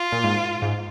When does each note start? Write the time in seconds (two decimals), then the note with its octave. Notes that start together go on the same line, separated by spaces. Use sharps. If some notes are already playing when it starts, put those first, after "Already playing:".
Already playing: F4
0.12 A#2
0.24 G#2
0.62 G#2